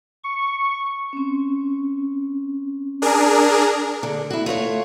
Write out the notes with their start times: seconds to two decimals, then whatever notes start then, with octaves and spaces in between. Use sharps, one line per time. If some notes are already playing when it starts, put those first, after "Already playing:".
0.24 C#6
1.13 C4 C#4
3.02 D4 G#4 A#4
4.03 D3
4.30 E4 F#4
4.46 A3 F4 C5 C#5